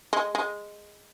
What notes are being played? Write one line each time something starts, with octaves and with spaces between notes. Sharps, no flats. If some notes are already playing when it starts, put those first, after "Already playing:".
G#3
G#3